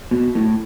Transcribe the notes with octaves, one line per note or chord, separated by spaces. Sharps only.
B2
A2